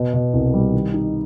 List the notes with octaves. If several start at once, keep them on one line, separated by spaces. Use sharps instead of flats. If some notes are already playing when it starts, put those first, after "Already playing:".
Already playing: B2
B2
C2
G3
D#3
D#4